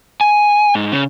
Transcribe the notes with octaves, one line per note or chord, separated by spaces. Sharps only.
G#5
G#2
C#3